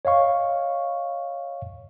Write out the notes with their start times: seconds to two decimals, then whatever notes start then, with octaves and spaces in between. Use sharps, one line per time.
0.05 C#5 D#5 F5 C#6